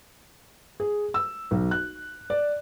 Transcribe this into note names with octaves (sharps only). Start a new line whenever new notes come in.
G#4
E6
B1
F#6
D5